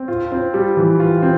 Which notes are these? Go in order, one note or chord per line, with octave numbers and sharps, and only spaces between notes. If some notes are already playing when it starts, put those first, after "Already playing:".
Already playing: C4
F4
C4
G3
E3
F4
C4